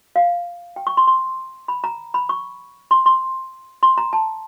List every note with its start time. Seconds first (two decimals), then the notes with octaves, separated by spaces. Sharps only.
0.16 F5
0.76 G5
0.87 C#6
0.97 C6
1.07 C6
1.68 B5
1.84 A#5
2.14 B5
2.29 C#6
2.91 C6
3.06 C6
3.83 C6
3.98 A#5
4.13 A5